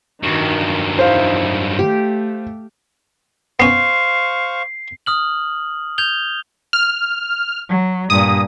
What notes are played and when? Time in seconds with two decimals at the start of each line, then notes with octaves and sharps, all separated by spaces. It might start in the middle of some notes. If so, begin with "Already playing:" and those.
0.24 G2 D#3 F#3
0.99 D#4 E4 C5 F5
1.79 A3 G4
3.60 B3 C#4 C5 F5 C#6 C7
5.06 D#6 F6 F#7
5.98 G6 G#6 F7 G7
6.73 F6
7.69 F#3
8.10 G2 A#2 D#6